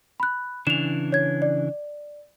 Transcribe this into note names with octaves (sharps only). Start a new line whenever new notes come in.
B5 F#6
C#3 E3 D4 E7 F7
C#5 G#6
D5